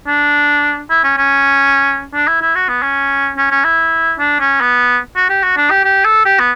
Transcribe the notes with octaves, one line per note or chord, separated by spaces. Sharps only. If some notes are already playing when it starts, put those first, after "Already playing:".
D4
E4
C#4
C#4
D4
E4
E4
F#4
B3
C#4
C#4
C#4
E4
D4
C#4
B3
F#4
G4
F#4
D4
G4
G4
A4
G4
B3